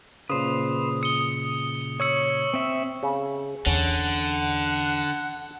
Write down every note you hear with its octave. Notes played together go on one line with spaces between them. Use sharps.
A#2 C#3 B4 C5 D#6
D#6 C#7 G7
C#5 C#6 E6 C#7
C4 E5
C#3
E2 D3 C#4 F#5